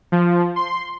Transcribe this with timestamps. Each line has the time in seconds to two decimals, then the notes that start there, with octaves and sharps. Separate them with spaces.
0.12 F3
0.56 C6